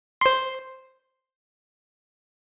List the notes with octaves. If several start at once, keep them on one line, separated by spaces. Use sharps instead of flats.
C5 C6